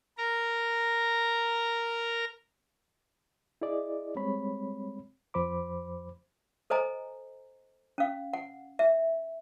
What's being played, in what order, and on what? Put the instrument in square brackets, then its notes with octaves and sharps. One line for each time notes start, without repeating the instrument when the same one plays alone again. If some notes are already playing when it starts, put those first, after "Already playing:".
[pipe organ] A#4 A#5
[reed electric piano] E4 G#4 D5 D#5
G3 G#3 C4 C#5 B5
F2 F3 C5 B5 D6
[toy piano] A4 C5 D#5 G#5 A#5
C#4 F5
F#5
E5